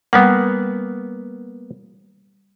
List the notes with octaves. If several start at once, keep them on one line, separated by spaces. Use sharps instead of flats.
G3 A#3 B3 F#5